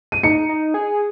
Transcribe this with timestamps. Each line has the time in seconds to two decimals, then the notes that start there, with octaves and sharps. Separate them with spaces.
0.12 D#7
0.23 D#4 C#7
0.49 D#4
0.74 G#4